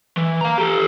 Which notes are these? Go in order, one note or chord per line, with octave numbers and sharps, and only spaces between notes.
E3
F5 A#5
G4 A4